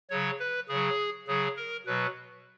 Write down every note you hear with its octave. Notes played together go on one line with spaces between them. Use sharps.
C#3 F#3 C#5
B4
C#3 F#3 G#4
C#3 F#3 G#4
A#4
B2 F#3 B4